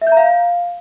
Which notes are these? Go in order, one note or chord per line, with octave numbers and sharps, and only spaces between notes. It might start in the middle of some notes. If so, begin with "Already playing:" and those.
E5
G6
A#5
F5